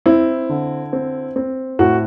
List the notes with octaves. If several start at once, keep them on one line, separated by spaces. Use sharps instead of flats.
C4 E4
D3
C4
C4
A2 F#4